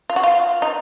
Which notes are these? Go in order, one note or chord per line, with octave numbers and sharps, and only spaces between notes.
F4
F#4
F4
D#4